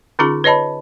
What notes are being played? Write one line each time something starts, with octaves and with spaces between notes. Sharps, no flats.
D3 C#4 D#4 F4 G#4 A#5
B4 C#5 D#5 A5 B5